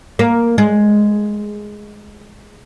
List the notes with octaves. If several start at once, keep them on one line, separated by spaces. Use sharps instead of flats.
A#3
G#3